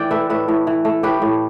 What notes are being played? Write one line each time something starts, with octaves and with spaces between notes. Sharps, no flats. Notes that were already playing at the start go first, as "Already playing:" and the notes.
Already playing: A2 E3 D5 G5
A3 B4 E5
A2 B4 E5
A2
E3
A3
A2 G4 B4
A2